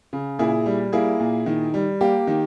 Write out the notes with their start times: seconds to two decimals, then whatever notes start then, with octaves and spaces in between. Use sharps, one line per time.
0.13 C#3
0.39 A#2 E4 G#4
0.66 G3
0.93 A#3 E4 G#4
1.20 A#2
1.46 D#3
1.74 G3
2.01 A#3 G4
2.27 D#3